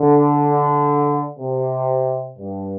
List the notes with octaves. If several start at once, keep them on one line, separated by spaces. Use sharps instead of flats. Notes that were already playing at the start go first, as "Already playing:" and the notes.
Already playing: D3
C3
G2